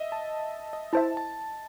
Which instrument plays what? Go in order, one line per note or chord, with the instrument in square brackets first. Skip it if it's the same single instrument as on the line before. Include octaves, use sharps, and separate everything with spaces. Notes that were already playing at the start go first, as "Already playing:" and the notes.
Already playing: [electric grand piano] D#5 E5
A5
D#5
[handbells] E4 C5 E5 [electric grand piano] A5
[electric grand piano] A5